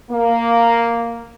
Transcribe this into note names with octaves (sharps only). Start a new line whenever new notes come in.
A#3